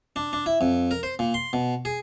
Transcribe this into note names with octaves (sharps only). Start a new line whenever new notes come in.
D4
D4
E4
F2
A#4
C5
A#2
C6
B2
G#4